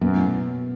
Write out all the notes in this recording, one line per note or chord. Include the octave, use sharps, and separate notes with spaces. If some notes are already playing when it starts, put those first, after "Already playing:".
F#2 B2
A2